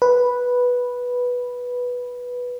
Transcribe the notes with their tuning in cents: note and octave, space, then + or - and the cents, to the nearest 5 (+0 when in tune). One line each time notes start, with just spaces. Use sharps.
B4 -5